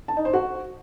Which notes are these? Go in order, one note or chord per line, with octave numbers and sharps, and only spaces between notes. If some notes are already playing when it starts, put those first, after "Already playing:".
A5
D#4
C5
F#4